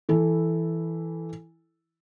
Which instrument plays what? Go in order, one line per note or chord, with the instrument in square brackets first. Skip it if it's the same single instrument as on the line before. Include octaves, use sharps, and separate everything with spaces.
[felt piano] E3 E4 A4